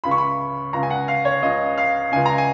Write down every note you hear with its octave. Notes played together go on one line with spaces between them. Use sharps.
C#2 C#3 B5
C#6
B5
C#2 C#3 A#5
G#5
F#5
F5
C#5
C#2 C#3 D#5
F5
C#2 C#3 G#5
A#5
G#5